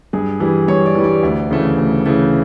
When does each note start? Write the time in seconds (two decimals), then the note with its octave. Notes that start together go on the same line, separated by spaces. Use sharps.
0.13 G2 G#4
0.40 E3 G3 G#4
0.68 G2 C#5
0.86 D5
0.95 E3 G3
1.04 D5
1.23 D2
1.50 C#3 E3 A3
1.78 D2
2.06 C#3 E3 A3